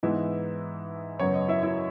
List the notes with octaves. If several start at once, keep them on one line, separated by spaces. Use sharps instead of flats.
G#2 E3 B3 D#4 E4 E5
F#2 C#3 F#3 B3 C#5
D#5
E4 E5
E4 E5